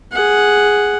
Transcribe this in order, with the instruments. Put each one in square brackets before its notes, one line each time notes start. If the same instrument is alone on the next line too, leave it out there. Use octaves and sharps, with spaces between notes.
[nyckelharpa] G#4 F#5